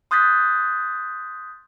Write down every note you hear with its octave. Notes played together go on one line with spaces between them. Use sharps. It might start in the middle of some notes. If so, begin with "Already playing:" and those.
C6 D#6 F#6 G6 A6 B6